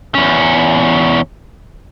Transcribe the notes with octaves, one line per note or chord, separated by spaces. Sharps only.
E2 C#4